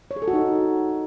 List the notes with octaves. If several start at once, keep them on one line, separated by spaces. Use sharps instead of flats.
C#5
G#4
A4
F#4
D#4